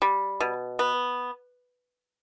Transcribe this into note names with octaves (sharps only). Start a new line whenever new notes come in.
G3
B2
B3